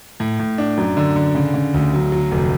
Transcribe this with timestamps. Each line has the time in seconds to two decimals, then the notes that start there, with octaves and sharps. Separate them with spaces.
0.20 A2
0.39 A2
0.58 D4
0.77 F#2
0.97 D3
1.16 D3
1.35 C#3
1.54 C#3
1.74 D2
1.94 F#3
2.12 F#3
2.32 F1